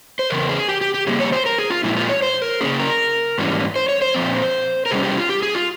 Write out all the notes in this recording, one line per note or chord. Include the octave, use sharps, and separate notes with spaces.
C5
E2 C#3 A#4
G#4
G4
G4
G4
C#3 G3 A#3 G#4
C#5
C5
A#4
G#4
F4
A#2 F3 G#3 E4
F4
C#5
C5
A#4
C#3 F3 A#3 C#4 G#4
A#4
G#2 E3 G3 A#3 C#4
C5
C#5
C5
A#2 F3 C4
A#4
C3 G3 C#4 G#4
G4
F4
G4
G#4
F4